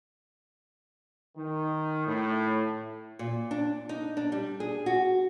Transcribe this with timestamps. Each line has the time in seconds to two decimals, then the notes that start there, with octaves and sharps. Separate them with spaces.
1.37 D#3
2.07 A2
3.19 A#2
3.51 D4
3.89 D#4
4.17 D4
4.32 G3
4.60 G#4
4.86 F#4